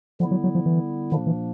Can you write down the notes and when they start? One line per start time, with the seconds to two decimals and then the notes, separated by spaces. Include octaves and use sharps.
0.20 D3 F3 G3 B3 E4
0.31 F#3
0.44 F#3
0.55 F3
0.66 E3
1.12 A#2 D#3 F3 A#3 D4
1.27 E3